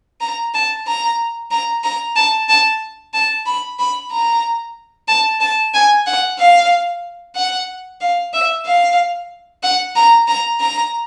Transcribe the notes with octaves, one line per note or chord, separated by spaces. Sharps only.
A#5
A5
A#5
A#5
A#5
A5
A5
A5
B5
B5
A#5
A5
A5
G#5
F#5
F5
F#5
F5
E5
F5
F#5
A#5
A#5
A#5